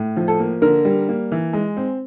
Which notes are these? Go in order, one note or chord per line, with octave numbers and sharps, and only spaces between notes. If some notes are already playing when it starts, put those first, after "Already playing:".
Already playing: A2
F3
A4
A#3
D3 A#4
G3
A#3
E3
G#3
C4